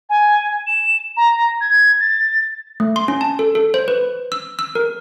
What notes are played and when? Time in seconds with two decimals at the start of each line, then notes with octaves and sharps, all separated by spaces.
0.09 G#5
0.67 E7
1.17 A#5
1.61 G#6
2.00 A6
2.80 A3
2.96 C6
3.08 C#4
3.21 A5
3.39 A4
3.55 A4
3.74 C5
3.88 B4
4.32 E6
4.59 E6
4.75 A#4